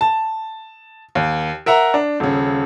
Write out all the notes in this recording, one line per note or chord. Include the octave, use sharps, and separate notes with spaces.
A5
D#2
A#4 E5 F#5 A#5
D4
D#1 C#3